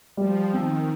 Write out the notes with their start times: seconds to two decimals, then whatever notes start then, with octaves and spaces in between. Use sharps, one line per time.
0.17 F3 G3
0.53 D#3 C4